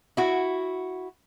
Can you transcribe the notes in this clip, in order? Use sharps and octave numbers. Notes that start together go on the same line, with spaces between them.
E4 F#4